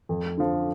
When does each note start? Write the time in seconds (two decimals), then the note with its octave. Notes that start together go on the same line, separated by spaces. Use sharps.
0.09 F2
0.38 D3 F3